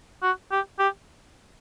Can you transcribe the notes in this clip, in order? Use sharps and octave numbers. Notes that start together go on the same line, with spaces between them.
F#4
G4
G4